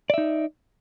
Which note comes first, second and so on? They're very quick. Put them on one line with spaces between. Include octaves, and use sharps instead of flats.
D5 E5 D#4